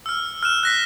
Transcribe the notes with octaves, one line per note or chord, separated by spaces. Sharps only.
E6 F6
F6 F#6 E7
F#6 A#6 B6